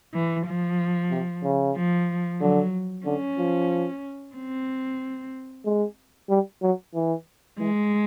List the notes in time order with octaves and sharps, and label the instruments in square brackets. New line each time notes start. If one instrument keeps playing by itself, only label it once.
[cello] E3
F3
[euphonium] C3
C#3
[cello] F3
[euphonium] D3 [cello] F#3
[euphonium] D3 [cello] C#4
[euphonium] F3
[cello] C4
[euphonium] G#3
G3
F#3
E3
[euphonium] E3 [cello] G#3